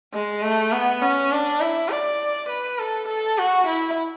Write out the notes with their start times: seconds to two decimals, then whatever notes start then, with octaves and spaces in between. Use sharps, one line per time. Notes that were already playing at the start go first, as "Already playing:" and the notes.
0.14 G#3
0.42 A3
0.72 B3
1.02 C#4
1.31 D4
1.60 E4
1.90 D5
2.49 B4
2.78 A4
3.08 A4
3.38 F#4
3.67 E4